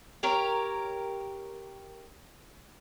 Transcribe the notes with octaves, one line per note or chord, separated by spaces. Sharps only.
G4 A#4 C#5